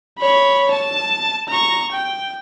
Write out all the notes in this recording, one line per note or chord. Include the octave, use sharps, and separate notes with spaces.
C#5 B5
A5
A#5 C#6
G5